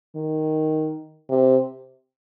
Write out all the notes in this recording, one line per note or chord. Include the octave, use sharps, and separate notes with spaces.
D#3
C3